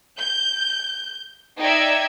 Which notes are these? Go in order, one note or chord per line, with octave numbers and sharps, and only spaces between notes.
G6
D#4 D5 E5 G5 G#6